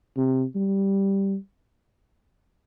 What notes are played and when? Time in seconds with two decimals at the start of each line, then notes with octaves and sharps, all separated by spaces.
0.17 C3
0.55 G3